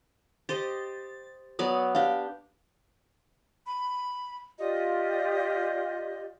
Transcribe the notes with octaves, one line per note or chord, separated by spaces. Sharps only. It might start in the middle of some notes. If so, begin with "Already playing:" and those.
G4 C5 D#5 A6
F#3 B3 D5 D#6
D4 G4 F5
B5
F4 G4 D5 D#5